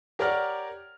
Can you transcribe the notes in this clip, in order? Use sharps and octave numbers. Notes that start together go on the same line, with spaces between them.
G4 A#4 C#5 D5 F#5 F6